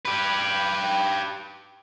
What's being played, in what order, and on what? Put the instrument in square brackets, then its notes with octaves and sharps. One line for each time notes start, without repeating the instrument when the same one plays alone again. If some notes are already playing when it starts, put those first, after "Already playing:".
[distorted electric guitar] G4 B4